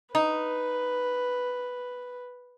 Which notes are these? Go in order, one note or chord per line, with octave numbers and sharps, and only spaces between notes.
D#4 B4